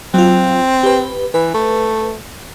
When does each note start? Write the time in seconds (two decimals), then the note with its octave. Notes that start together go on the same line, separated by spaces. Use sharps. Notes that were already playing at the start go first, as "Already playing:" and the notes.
0.14 F#3 C4 F4
0.83 G4 B4
1.34 E3 B4
1.54 A3